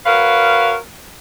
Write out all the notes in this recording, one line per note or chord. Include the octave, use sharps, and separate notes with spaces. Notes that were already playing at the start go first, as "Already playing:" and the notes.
F#4 A#4 B4 C#5 F5